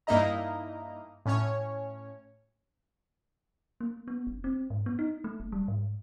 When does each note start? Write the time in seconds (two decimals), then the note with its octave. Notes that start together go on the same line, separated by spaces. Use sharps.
0.07 G2 A#3 D#4 E4 D#5 A#5
1.26 A2 C#4 C#5
3.81 A#3
4.08 B3
4.27 F1
4.44 C4
4.70 G#2
4.86 B3
4.99 D#4
5.24 A3
5.40 F1
5.52 G3
5.68 G#2